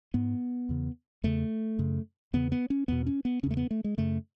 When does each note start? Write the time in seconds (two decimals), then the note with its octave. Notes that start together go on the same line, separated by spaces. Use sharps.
0.14 G#2 B3
0.69 E2 C#3
1.24 E2 C#3 A3
1.79 F#2 C#3
2.33 E2 C#3 B3
2.52 B3
2.70 C#4
2.88 E2 B2 B3
3.07 C#4
3.25 B3
3.43 C#3 C#4
3.46 E2 A3
3.57 B3
3.71 A3
3.84 G#3
3.98 F#2 C#3 A3